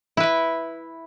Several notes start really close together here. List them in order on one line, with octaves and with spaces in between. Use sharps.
E4 B4 E5